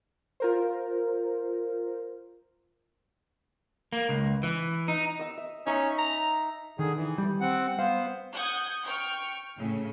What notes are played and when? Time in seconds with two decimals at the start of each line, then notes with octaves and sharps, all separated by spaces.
0.40 F4 A#4 C5
3.93 A#3
4.09 C#2
4.43 E3
4.88 D#4
5.19 D#5 E6
5.38 E5
5.67 C#4 D#4 E5
5.98 A#5
6.79 D3 D#3 G#4
6.95 E3
7.18 G3
7.41 C4 F#5
7.79 B3 C5 F5
8.35 F#5 D#6 G6 G#6
8.83 G5 C#6 F6
9.57 A2 C#3